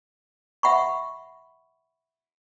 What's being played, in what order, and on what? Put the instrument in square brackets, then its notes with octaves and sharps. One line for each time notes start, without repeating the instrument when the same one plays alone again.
[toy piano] E5 F#5 B5 C#6